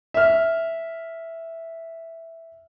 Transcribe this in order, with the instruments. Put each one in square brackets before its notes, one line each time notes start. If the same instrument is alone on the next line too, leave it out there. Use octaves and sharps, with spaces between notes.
[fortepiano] E5 F6